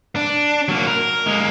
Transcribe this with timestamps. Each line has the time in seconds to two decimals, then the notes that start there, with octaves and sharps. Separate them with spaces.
0.16 D4
0.69 F#3 A#3
0.87 A#4
1.27 G#3 A#3